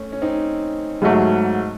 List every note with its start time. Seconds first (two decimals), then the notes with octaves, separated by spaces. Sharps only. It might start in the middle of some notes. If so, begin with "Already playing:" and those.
Already playing: A3 C#4
0.12 C#4
0.22 C4 D#4
1.02 G#2 F#3 A3